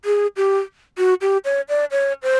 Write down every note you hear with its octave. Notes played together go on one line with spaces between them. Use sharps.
G#4
G4
F#4
G4
C#5
D5
C#5
C5